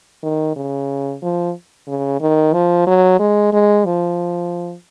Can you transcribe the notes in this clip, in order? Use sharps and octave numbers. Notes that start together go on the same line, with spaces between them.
D#3
C#3
F3
C#3
D#3
F3
F#3
G#3
G#3
F3